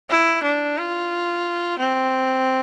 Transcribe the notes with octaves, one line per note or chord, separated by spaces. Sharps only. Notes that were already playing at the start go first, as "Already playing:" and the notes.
E4
D4
F4
C4